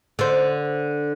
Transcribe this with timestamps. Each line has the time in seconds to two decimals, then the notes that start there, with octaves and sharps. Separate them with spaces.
0.19 D3 C5